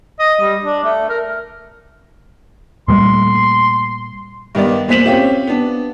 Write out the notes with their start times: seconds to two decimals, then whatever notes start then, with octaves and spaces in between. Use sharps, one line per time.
0.20 D#5
0.41 G3
0.63 D4
0.84 A3
1.09 A#4
2.88 A#2 G3 A3 C6
4.55 G2 D#3 B3 D5
4.88 E2 A#2 C5 B6 E7 F#7
5.06 C4 C#4 F4 G4
5.47 B3 D4